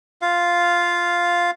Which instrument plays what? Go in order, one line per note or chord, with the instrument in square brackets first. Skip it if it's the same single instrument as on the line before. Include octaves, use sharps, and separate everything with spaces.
[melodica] F4 F5